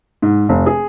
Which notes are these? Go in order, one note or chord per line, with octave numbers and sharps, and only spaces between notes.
G#2
F1
G#4